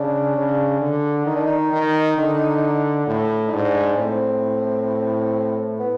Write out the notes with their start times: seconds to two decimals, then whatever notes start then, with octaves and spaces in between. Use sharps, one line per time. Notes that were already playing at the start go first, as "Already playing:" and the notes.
Already playing: C#3 D4
0.37 C#3
0.81 D3
1.26 D#3 D#4
1.36 D4
1.47 D#4
1.72 D#3
2.18 D3
3.07 A2
3.48 D#4
3.52 G#2 D4
3.98 A2 C4
5.79 B3